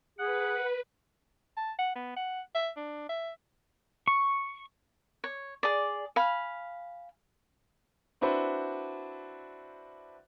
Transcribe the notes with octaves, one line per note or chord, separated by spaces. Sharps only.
G#4 B4 F#5
A5
F#5
B3
F#5
E5
D4
E5
C#6
C#5
G#4 D5
F5 G#5 B5
C4 D4 E4 F#4 B4 C5